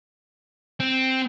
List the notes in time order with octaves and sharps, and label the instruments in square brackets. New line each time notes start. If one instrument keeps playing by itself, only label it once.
[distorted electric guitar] C4